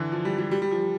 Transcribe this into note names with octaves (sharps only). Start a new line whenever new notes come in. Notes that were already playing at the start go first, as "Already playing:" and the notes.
Already playing: D3 E3
F3
G3
G3
G3
G3
F3